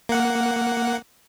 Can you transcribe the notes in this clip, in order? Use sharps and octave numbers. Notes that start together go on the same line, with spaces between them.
A#3 F#5